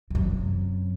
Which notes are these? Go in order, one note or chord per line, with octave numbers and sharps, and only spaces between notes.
F#2 C3